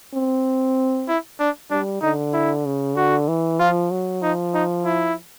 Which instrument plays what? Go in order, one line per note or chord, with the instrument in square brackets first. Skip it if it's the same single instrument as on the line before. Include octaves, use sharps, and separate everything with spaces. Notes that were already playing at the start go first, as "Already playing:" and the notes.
[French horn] C4
[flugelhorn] E4
D4
[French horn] G3 [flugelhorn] D4
[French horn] D3 [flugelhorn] D#4
[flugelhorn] E4
[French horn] C#3
[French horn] D3 [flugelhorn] F#4
[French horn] E3
[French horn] F3 [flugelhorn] F4
[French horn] F#3
[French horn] F3 [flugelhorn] D#4
[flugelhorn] D#4
E4